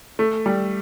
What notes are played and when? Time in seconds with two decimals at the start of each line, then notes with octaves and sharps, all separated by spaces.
0.19 A3
0.46 G3